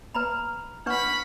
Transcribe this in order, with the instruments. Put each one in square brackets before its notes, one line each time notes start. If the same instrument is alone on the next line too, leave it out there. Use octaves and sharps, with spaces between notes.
[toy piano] B4 A#5 B5
[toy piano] D4 B4 C#6 [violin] F#5 B5